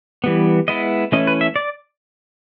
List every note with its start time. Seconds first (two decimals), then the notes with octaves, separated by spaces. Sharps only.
0.24 E3 G3 B3
0.68 G#3 B3 E4 D#5
1.12 E3 A3 C#4 E4 D#5
1.27 B4
1.41 E5
1.56 D5